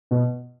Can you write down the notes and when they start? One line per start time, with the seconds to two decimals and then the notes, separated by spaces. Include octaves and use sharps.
0.11 B2